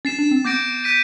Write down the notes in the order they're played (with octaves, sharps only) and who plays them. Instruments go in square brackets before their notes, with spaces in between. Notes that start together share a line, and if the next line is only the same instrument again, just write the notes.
[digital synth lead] C#4 [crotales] A6 C7 E7
[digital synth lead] D4
C4
[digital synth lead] B3 [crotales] D6 G6 A#6 D7
[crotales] G6 B6 D#7